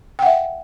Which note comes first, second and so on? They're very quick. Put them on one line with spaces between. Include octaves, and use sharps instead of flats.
G5 F#5 E5